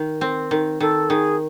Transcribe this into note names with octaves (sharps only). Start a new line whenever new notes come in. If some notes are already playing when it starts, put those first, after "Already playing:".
Already playing: D#3
C4
D#3
D#3 A4
D#3 G#4